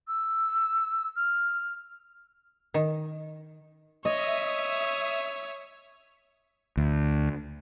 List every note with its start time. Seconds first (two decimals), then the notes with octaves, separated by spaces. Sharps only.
0.07 E6
1.16 F6
2.74 D#3
4.05 C#5 D#5 E5 D#6
6.77 D2